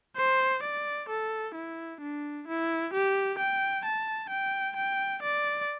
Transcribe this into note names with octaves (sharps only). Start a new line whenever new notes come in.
C5
D5
A4
E4
D4
E4
G4
G5
A5
G5
G5
D5